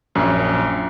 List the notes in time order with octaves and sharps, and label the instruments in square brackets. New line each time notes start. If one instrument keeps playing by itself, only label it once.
[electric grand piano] A#1 F#2